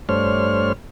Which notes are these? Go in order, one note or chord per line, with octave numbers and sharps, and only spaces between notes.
G2 A3 D4 C5 C#5 F6